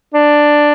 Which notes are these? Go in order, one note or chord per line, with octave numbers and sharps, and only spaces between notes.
D4